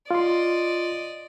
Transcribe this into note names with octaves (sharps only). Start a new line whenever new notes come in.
F4 D5 D#5 C6